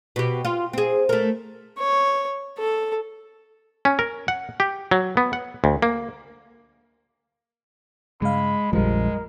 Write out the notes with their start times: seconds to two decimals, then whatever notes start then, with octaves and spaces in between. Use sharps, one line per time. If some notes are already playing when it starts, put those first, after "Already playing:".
0.16 B2 G4
0.45 F4
0.73 C4 G#4
1.09 A3 A#4
1.78 C#5
2.59 A4
3.85 C#4
3.99 A#4
4.28 F#5
4.60 G4
4.91 F#3
5.17 B3
5.33 F#5
5.64 D2
5.82 A#3
8.22 G2 C#3 G#3 F5 B5
8.73 A#1 F2 F3 G3 G#3 A#4